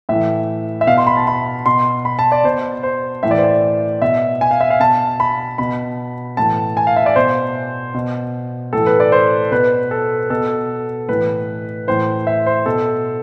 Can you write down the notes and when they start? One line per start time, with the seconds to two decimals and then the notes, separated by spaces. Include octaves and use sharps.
0.09 A2 E3 E5
0.81 E5
0.87 B2 F5
0.98 C6
1.07 B5
1.17 A5
1.27 B5
1.66 B2 C6
2.05 B5
2.19 A5
2.32 D5
2.44 B2 C5
2.83 C5
3.23 A2 E3 E5
3.31 D5
3.38 C5
3.44 D5
4.02 B2 E5
4.41 G#5
4.51 F5
4.61 E5
4.70 F5
4.80 B2 A5
5.20 B5
5.58 B2 B5
6.37 A2 E3 A5
6.77 G#5
6.87 F5
6.97 E5
7.06 D5
7.16 B2 C5
7.94 B2
8.73 A2 E3 A4
8.86 B4
9.00 D5
9.12 C5
9.52 B2 B4
9.91 A4
10.30 B2 A4
11.08 A2 E3 B4
11.87 A2 E3 C5
12.27 E5
12.46 C5
12.66 B2 A4